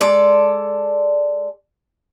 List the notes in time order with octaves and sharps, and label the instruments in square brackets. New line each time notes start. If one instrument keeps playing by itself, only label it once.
[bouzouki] G#3 A4 D5